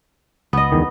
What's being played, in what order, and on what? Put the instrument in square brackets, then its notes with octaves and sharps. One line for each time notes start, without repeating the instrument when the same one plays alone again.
[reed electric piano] C#2 [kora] B3 D#5
[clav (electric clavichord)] E2 D#3